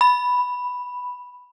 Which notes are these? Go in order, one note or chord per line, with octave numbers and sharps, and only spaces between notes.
B5